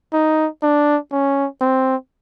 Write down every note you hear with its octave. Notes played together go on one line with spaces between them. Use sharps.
D#4
D4
C#4
C4